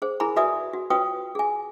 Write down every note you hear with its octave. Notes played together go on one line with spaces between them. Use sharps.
G#4 C5
E4 G#4 A#4 G#5 A#5 B5
F#4 B4 D5 E5 G#5 D#6
F#4
F4 F#4 B4 C#5 G5 D#6
G#4 G#5